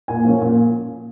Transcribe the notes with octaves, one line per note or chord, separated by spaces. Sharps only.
A#2 G#5
F3 A#3 C#4
A#2